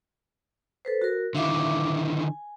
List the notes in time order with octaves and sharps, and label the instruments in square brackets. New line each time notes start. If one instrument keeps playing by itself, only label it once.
[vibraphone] A4 B4 C5
F#4 A#4
[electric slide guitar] D3 D#3 E4 [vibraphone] E5 F5 D6
[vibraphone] G#5